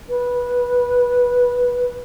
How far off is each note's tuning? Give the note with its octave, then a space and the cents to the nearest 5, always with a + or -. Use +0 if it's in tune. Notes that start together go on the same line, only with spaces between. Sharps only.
B4 -15